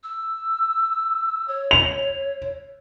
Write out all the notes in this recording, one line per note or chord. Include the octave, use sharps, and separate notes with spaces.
E6
C#5
F7